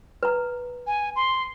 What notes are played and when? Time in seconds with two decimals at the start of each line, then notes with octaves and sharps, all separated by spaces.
0.23 B4 A#5
0.87 G#5
1.16 C6